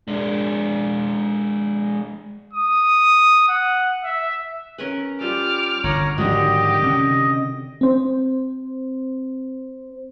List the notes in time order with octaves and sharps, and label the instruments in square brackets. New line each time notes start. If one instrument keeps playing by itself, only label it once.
[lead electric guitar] G#3 D4
[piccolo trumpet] D#6
F#5
E5
[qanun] C#4 A#4 B4
[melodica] G3 [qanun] F4 A4 [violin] D6 F6
[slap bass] G1 D3 [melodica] C#5 A#5 [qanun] F#5
[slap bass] G#2 F3 F#3 [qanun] D3 D#3 F#4 [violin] G4 [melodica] D#5
[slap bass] C3 C#4
[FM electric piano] C4 C5